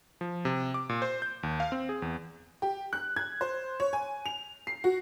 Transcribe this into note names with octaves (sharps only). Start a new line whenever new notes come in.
F3
C3
D6
A#2
C5
G6
D#2
F5
C4
G#4
E2
G4
F#6
G#6
C5
C#5
G#5
F7
C7
F#4